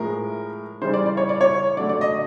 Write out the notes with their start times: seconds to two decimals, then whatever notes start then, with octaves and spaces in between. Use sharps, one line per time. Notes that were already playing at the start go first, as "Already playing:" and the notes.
Already playing: A2 F3 G#3 A#4
0.82 C#3 E3 G3 C5
0.94 D5
1.06 D5
1.17 C#5
1.29 D5
1.41 C#5
1.77 D3 F#3 A3 D5
1.89 D5
2.01 D#5